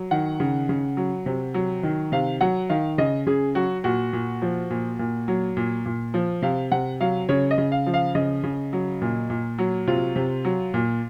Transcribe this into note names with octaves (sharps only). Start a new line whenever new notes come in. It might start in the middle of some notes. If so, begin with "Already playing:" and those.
Already playing: F#3
D#3 F#5
C#3
C#3
F#3
C3
F#3
D#3
C3 F5
F#3 F#5
D#3 F5
C#3 D#5
C#3 G#4
F#3 F#4
A#2 F#4
A#2
F3
A#2
A#2
F#3
A#2
A#2
F3
C3 F5
C3 F#5
F#3 F5
C#3 C#5
D#5
C#3
F5
F3
F5
C#3 D#5
C#3
F#3
A#2
A#2
F#3
C3 F4
C3
F#3
A#2